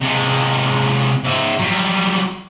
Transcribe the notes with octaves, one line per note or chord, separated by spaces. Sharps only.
C3 G#3
G#2 E5
F#3 G3